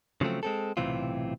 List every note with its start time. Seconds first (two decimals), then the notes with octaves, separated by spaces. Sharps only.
0.21 C#3 F3 F#3 A3 C4
0.43 G#3 C4 A4
0.77 B1 A2 C3 E3 C4 F4